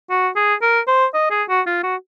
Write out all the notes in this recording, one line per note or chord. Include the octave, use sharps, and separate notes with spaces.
F#4
G#4
A#4
C5
D#5
G#4
F#4
F4
F#4